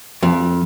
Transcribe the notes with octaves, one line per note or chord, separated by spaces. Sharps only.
F2